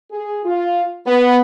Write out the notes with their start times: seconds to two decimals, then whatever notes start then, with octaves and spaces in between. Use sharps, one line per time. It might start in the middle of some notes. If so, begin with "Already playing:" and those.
0.11 G#4
0.45 F4
1.06 B3